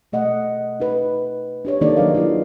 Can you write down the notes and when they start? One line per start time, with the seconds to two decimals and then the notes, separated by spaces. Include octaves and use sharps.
0.13 B2 A3 D#5 F#5
0.80 D#4 B4
1.65 D4 G4 C#5
1.81 D#3 A#3 D4 D#4 A4 D5
1.97 F#3 A#3 D4 G#4 B4 F5
2.15 F#3 E4 F4 G#4